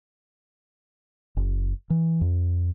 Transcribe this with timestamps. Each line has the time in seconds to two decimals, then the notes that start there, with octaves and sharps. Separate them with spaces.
1.37 F#1
1.90 E3
2.21 F2